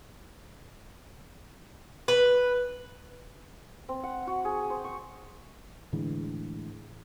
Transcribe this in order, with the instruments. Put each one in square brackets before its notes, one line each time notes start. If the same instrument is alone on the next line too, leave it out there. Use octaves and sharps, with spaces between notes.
[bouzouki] B4
[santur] C4
F#5
F#4
G#4
C5
C#6
[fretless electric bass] A2 D3 E3 G#3